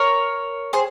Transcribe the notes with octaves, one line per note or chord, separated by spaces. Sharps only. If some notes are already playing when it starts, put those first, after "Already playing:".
Already playing: A#4 C#5
G#4 C5